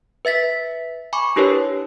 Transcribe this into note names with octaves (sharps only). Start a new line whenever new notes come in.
B4 E5 A6 B6
G#5 B5 C#6 D6
D4 E4 G4 A#4 B4 C#5